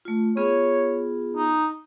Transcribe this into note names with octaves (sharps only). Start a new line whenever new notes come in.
A3 F4
B3 F4 G#4 C#5
D#4